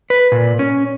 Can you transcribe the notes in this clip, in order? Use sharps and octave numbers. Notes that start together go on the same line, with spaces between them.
B4
A#2
C#4